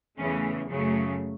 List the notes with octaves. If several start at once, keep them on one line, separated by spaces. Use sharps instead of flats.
E2 C#3 E3 A3 C#4
F#2 C#3 F#3 A3